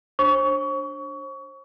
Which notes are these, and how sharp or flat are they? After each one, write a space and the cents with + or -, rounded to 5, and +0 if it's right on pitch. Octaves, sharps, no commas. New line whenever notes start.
D4 +0 C5 +40 C#6 +25